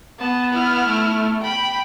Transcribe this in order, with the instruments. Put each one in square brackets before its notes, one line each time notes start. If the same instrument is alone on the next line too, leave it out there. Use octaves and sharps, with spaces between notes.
[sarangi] B3 [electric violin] A5
[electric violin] E4 F6
[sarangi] A3
[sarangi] G5 [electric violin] B5